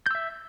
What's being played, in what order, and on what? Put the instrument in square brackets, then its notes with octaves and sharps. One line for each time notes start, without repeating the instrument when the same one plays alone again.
[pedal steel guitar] G6
E6
E5